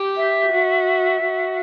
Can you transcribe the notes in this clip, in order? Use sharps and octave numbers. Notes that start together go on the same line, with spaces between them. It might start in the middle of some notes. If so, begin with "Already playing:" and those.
Already playing: G4
E5
F#4
F#4